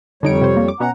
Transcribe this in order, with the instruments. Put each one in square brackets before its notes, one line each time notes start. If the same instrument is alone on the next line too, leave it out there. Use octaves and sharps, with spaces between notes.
[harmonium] F2 G3 C#5 [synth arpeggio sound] D3 D#4 D7
[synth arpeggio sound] C3 C5
A#3
D6
[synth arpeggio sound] B2 B3 C#4 [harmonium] F#5 A#5